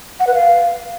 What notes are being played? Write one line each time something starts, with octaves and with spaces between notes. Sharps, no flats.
F#5
B4
F5